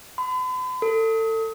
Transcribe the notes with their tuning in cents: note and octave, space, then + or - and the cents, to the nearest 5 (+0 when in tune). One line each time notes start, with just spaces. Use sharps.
B5 +45
A4 +30